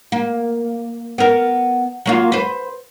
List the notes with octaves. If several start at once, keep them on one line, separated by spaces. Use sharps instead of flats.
A#3
B3 A#4
F#3 A#3 F4
B4 C5